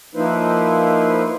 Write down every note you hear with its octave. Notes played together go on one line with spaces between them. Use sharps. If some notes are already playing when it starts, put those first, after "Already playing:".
F3 A#3 D#4 E4 B4 C5